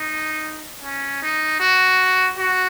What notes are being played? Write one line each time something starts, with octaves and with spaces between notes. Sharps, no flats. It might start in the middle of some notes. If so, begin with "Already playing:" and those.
Already playing: D#4
C#4
D#4
F#4
F#4